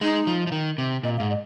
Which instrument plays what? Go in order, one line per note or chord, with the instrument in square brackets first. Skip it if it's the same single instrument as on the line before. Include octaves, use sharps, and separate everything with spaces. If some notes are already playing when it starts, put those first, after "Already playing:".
[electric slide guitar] G#3 [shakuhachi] D#4
[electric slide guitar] F3
F3
D#3
C3
[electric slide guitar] A#2 [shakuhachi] D#5
[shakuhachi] F5
[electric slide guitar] G#2
[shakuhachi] D#5